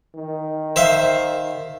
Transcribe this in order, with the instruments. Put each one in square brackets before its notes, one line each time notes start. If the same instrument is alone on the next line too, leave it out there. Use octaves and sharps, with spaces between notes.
[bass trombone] D#3
[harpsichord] C5 E5 F5